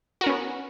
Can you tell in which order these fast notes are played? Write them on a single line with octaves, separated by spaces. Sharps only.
F#4 A#4 C#4 B3